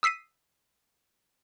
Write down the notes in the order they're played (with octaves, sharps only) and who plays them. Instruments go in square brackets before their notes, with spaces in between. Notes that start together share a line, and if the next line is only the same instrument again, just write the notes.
[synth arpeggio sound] D#6 E6 B6 C7 D#7